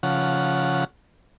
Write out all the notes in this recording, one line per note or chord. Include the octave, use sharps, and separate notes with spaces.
C#3 F3 F#5